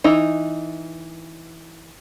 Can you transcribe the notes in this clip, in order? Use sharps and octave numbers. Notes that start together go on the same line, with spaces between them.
E3 D#4